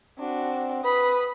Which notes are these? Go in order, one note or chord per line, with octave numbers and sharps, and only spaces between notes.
C4 D4 F#4
B4 B5 D#6